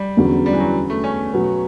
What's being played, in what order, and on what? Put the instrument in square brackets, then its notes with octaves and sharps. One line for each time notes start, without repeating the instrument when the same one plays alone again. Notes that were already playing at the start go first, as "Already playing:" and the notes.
Already playing: [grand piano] G3
[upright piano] E2 D3 F#3 C#4
[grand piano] G3
E3
F#3
A3
C#4
[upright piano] B2 F#3 B3